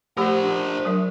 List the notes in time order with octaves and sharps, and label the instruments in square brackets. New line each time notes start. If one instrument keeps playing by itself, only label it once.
[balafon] F3 A3 G4 [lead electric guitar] A#4 C5 [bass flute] F#5
[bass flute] D4
[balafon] F#3 A#4 E5